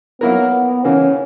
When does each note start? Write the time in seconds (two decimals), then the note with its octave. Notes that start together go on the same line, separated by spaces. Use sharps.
0.21 F#3 A#3 B3 E4 A#4
0.84 C#3 E3 A#3 C#4